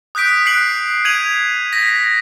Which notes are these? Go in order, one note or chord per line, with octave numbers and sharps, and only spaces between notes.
D#6 F#6 G6 B6 D7
F#6 C7 D7 F#7
G#6 D#7 F7 F#7
A#6 B6